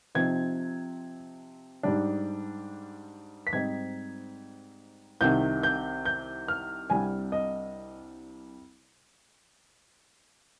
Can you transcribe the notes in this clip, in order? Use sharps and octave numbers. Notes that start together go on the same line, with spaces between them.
C3 F3 C4 D#4 G#6
G#2 G3 D4
B6
G#2 G3 C4 D#4 G#6
C2 C3 D#3 G6
G6
G6
F6
C2 C3 G3 D4 G#5
D#5